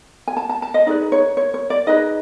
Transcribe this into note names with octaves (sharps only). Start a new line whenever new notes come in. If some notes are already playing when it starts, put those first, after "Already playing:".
G#5
A5
A5
A5
D#5
D#4 G#4 B4 D5
C#5
C#5
C#5
D5
D#4 G#4 B4 D#5